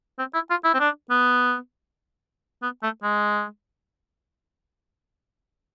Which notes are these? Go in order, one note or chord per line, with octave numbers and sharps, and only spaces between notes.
C4
E4
F4
E4
C4
D4
B3
B3
A3
G#3